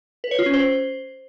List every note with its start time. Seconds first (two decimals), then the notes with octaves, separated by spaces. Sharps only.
0.24 B4
0.31 C#5
0.39 F4
0.46 C#4
0.54 C5